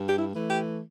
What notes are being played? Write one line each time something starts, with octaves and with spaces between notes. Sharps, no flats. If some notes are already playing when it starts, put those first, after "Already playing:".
Already playing: G2
G4
E4
E3 A3
G4